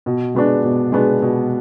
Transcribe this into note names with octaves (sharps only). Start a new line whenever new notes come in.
B2
G#3 B3 D4
B2
G#3 B3 D4
B2